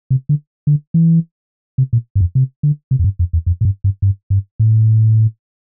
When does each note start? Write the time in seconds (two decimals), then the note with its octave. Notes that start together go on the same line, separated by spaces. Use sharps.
0.11 C3
0.29 D3
0.67 D3
0.94 E3
1.78 C3
1.93 A#2
2.15 G2
2.20 F2
2.35 C3
2.63 D3
2.91 C3
2.99 F2
3.04 G2
3.19 F2
3.33 E2
3.46 F2
3.61 A2
3.65 G2
3.84 G2
4.02 G2
4.30 G2
4.60 A2